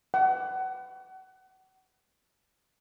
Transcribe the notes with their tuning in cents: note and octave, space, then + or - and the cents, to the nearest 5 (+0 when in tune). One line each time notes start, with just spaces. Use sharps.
F#5 +35